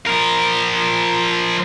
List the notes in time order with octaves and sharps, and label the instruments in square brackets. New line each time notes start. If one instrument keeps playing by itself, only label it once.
[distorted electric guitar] F3 A#4